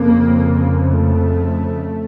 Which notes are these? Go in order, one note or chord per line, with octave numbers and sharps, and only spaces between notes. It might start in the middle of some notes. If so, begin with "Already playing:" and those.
Already playing: F2 C#3 A#3
A3